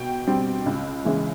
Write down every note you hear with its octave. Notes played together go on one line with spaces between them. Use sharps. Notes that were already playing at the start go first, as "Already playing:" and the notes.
Already playing: B2 G5
G3 C4
C#2
C#3 E3 G#3